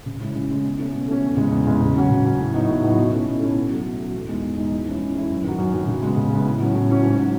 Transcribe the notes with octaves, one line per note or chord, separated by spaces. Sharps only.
C#3
G#3 C#4 E4
C#3
G#3 C#4 E4
B2
A3 C#4
B2
A3 C#4
E2
C#3 G#3
E2
C#3 G#3
C#3
F#3 C#4 F#4
C#3
F#3 C#4 F#4
A2
F#3 B3 D#4 F#4
A2
F#3 B3 D#4 F#4
B2
A3 C#4 E4
B2
A3 C#4 E4
B2
F#3 A3
B2
F#3 A3
E2
B2 G#3 D#4
E2
B2 G#3 D#4
E3
G#3 C#4 E4
E3
G#3 C#4 E4
F#2
D#3 F#3
F#2
D#3 F#3
C#3
G#3 B3
C#3
G#3 B3
A2
F#3 C#4
A2
F#3 C#4
G#2
F#3 C#4